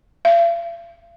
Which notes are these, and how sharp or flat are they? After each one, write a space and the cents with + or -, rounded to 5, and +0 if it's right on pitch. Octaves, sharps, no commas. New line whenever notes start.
F5 -45